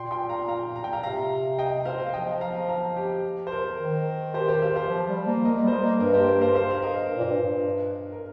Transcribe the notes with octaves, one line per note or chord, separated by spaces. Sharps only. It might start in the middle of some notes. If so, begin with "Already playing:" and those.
Already playing: A#2 G5 C6
G5 C6
F5 A#5
F5 A#5
A#5
G5
F5 A#5
A#2
C3 F5 A#5
D#5 G5
C5 F5
F5
F3 D#5 G5
F5 A#5
F5 A#5
G4
C5
A#4
D#3
G4 C5
G4 C5
C5 F5
C5 F5
F3
G3
A#3
A#3 A#4 D#5
G3 C5
A#4 D#5
A#3
G2 A#4 D#5
G4 C5
A#4
C5 F5
C5 F5
F5
A#4 D#5
G2
A#2
G2
A#4